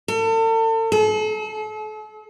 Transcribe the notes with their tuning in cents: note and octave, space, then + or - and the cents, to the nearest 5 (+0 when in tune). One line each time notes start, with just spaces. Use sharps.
A4 +40
A4 -40